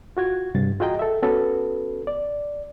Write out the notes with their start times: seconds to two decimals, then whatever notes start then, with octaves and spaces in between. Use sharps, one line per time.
0.17 F4 F#4 G#6
0.55 C2 G2 A6
0.80 F4 F#4 G#4 D#5 G5 A#5
0.99 A4 E5
1.23 B3 C#4 F#4 A4 B4
2.07 D5